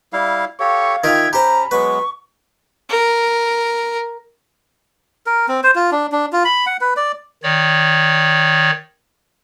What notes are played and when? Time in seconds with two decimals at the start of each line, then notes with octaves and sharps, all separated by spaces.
0.13 G3 E4 F5
0.60 G4 A4 C#5 F5 C#6
1.04 D#3 F4 E5 G5 G#6
1.33 C#4 G4 C5 A#5 B5
1.71 F#3 G#3 B3 B4 C#6
2.90 A#4
5.26 A#4
5.48 C4
5.63 C5
5.75 F4
5.92 D4
6.12 D4
6.33 F4
6.45 B5
6.66 F#5
6.81 B4
6.97 D5
7.43 D#3 C#5 D5